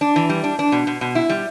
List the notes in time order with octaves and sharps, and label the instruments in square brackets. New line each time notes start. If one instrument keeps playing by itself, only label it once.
[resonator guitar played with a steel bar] D4
E3
G3
D4
D4
B2
B2
B2
E4
G3